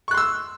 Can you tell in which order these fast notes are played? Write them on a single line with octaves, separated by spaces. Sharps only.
C#6 F#6 C6 E6